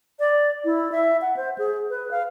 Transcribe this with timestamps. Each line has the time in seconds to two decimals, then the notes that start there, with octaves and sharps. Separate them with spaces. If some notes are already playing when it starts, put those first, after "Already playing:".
0.19 D5
0.65 E4
0.92 E5
1.22 F#5
1.37 C5
1.58 G#4
1.90 B4
2.11 F5